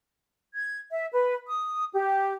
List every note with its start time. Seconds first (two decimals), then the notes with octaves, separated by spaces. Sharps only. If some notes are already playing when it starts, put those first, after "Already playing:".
0.54 G#6
0.90 E5
1.12 B4
1.46 D#6
1.93 G4